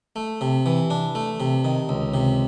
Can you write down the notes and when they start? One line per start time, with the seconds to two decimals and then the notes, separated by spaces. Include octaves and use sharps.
0.16 A3
0.41 C3
0.66 E3
0.90 D4
1.15 A3
1.40 C3
1.65 D#3
1.89 C#2
2.14 C3